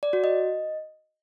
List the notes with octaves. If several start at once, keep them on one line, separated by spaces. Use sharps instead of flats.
D5
F#4
D#5